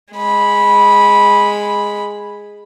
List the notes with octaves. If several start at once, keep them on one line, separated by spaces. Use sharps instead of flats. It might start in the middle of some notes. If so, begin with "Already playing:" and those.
G#3 B5